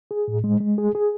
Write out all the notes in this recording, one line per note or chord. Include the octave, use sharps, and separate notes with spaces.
G#4
A2
G#3
G#3
G#4
G#4